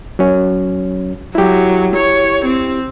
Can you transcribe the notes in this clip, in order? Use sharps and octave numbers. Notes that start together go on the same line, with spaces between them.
F#3 C#4
F#3 E4 G4
C#5
C4